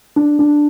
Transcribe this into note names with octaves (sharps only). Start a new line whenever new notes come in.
D4
D4